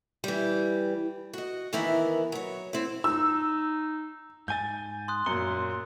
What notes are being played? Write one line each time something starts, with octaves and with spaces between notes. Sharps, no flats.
E3 G3
F#4 D#5
D#3 E3 B3 E4 A#4
F#3 C#5
C4 E4
D#4 E6
G#2 G#5 G6 A6
C6 D#6 F#6
F#2 A#2 C6 C#7